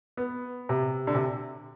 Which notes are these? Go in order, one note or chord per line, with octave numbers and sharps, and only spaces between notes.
B3
C3
D3
C3